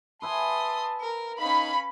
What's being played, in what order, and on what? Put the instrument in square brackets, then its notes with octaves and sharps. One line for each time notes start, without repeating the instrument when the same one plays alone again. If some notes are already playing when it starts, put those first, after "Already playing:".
[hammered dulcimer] B4 E5 G#5 [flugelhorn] A5 [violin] C6 D#6
[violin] A#4
[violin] C#4 F5 [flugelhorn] D#4 [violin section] B5